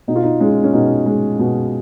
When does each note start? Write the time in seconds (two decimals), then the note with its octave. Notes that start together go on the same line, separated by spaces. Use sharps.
0.08 B2 D#4
0.16 F4
0.23 D#4
0.40 G#3 C#4
0.64 C#4
0.73 B2 D#4
1.06 G#3
1.39 B2